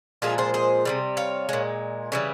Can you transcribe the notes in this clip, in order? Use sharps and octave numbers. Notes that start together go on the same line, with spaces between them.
A#2 F3 G#3 F4 G#4
G#4 C5
G#4 C5
C3 E3 G3
C#5 F5
A#2 G#3
C#3 E3 G3